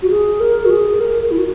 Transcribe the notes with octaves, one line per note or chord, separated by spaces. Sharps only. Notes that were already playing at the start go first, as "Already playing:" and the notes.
F#4
G#4
A#4
F#4
G#4
A#4
A#4
E4
F#4